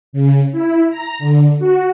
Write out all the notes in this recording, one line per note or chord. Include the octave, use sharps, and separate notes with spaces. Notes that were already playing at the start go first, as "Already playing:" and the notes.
C#3
E4
A#5
D3
F#4